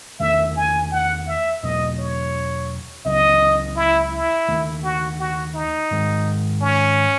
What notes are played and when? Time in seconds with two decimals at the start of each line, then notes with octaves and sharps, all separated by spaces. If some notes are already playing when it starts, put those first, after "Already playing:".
0.19 E2 D#3 A3 C#4 E5
0.56 G#5
0.91 F#5
1.27 E5
1.62 E2 B2 F#3 B3 D#5
1.99 C#5
3.05 C#2 C#3 F#3 B3 D#5
3.76 E4
4.13 E4
4.48 D#2 D#3 A3
4.84 F#4
5.19 F#4
5.55 D#4
5.91 G#2 D#3 G#3
6.61 C#4